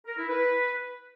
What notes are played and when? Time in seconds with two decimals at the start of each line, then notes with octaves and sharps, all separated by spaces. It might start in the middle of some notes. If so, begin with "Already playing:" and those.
0.06 A#4
0.18 E4
0.29 B4